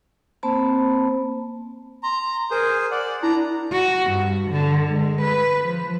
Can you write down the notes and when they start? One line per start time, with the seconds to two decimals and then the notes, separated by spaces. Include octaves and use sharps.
0.43 A#3 C4 C5 A5 B5
2.03 A#5 C6
2.51 G#4 A#4 C5
2.91 D5 F#5
3.23 D4 E4 A#5
3.72 F#4
4.11 G2
4.51 D3
4.89 G#3
5.22 B4
5.65 F3